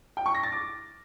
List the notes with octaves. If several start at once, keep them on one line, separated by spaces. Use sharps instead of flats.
G5
C#6
A#6
A6
D6